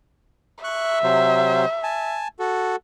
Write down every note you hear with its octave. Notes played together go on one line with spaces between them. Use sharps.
E5 C#6 F#6
C3 F#3 C5
G#5 A5
F#4 A4